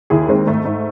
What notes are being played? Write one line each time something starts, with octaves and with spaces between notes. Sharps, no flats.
D#2 E4 G#4
D#3 G#3 C4
G#2 A3
G#2